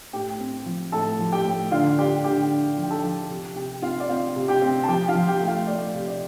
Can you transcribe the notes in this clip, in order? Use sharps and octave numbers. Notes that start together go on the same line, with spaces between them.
A2 G4 G5
C4
F3
A2 A4 A5
F3
G4 G5
A2
D3 F4 F5
D4 G4 G5
D3 G4 G5
D4
F3
G5
A4 A5
F3
C3
C3 G4 G5
C4 F4 F5
D5
C4 F4 F5
C3
G4 G5
C4
A5
F3 G4 G5
F4 F5
F3
G4 G5
A3
F4 F5
A3 D5
C3
D5